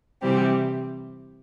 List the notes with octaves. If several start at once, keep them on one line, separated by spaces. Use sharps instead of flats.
C3 E3 G3 C4 G4